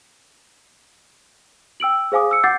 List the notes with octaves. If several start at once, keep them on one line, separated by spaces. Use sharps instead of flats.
G5 E6 D7 F#7
G#4 C5 F5 G#5 D6 D#6
E6 C#7
F#5 D6 G6 A6 C7